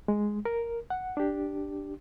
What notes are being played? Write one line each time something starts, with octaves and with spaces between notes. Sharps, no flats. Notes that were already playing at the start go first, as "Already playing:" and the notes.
G#3
A#4
F#5
D4 G4